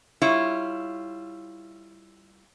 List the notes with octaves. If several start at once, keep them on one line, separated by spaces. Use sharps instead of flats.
G3 E4 F4 C#5